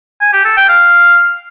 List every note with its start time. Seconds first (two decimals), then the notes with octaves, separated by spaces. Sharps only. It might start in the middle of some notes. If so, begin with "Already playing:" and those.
0.21 G#5
0.33 G4
0.45 A4
0.57 G5
0.68 F5